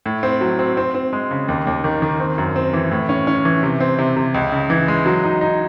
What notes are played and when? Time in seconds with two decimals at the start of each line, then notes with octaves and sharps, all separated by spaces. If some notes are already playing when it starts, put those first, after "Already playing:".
0.06 A2
0.23 C4
0.41 F#3
0.59 C4
0.77 C4
0.95 C4
1.13 G#3
1.31 C#3
1.48 D#2
1.67 D#2
1.84 D#3
2.02 D#3
2.20 C4
2.38 F#2
2.56 C4
2.73 E3
2.91 A2
3.09 C#4
3.27 C#4
3.45 E3
3.63 C3
3.80 C4
3.98 C3
4.16 C3
4.34 C#2
4.52 C#3
4.70 E3
4.88 G#3
5.06 F#3
5.24 D#4
5.41 D#4